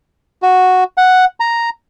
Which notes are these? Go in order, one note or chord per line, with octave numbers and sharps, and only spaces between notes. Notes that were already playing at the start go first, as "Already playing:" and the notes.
F#4
F#5
A#5